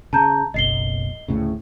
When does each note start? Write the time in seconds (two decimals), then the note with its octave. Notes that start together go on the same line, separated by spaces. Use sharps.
0.13 C#3 A5 A#5 G6
0.54 F#1 B1 D#5 C7 G7
1.28 D2 A2 C#3